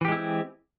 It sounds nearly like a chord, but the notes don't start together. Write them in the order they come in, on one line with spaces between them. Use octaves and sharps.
E3 G4 G#3 E4 C4